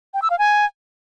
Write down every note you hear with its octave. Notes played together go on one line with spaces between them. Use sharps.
G5
E6
F5
G#5